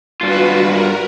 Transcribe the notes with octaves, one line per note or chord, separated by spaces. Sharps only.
G2 F4 F#4 B4
A#4